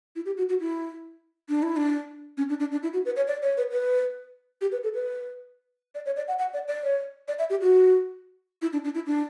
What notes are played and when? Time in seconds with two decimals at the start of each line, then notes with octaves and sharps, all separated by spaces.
0.16 E4
0.26 G4
0.37 F#4
0.49 F#4
0.60 E4
1.49 D4
1.63 E4
1.76 D4
2.38 C#4
2.49 D4
2.60 D4
2.72 D4
2.83 E4
2.93 F#4
3.05 B4
3.16 C#5
3.27 D5
3.42 C#5
3.57 B4
3.72 B4
4.61 G4
4.72 B4
4.83 A4
4.94 B4
5.95 D5
6.06 C#5
6.17 D5
6.28 F#5
6.39 F#5
6.54 D5
6.68 D5
6.83 C#5
7.28 D5
7.39 E5
7.50 G4
7.61 F#4
8.62 E4
8.73 D4
8.84 D4
8.95 E4
9.06 D4